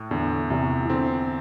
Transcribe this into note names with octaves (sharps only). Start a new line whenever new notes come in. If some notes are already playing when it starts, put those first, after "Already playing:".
Already playing: A2
E2 D3
E2 C3
E3
D3 C4